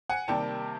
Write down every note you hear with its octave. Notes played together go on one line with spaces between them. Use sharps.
F#5 G#5
C3 D#3 G3 A#3 G5 A5